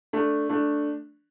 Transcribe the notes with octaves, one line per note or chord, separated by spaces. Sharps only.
A3 D4
A3 D4